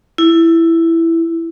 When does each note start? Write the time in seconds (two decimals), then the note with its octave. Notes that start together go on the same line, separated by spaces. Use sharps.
0.18 E4